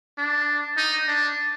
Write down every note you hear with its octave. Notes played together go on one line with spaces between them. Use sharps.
D4
D#4
D4